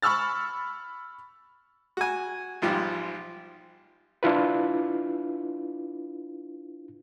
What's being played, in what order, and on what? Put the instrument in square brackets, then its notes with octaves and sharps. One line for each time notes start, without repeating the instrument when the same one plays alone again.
[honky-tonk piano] B5 C#6 E6 F6 A6
[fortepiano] F#4 G#5
B1 G#2 F3 G3
[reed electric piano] D4 E4 F4 B4